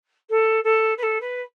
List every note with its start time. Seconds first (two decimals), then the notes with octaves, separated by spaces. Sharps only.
0.30 A4
0.64 A4
0.98 B4
1.03 A4
1.21 B4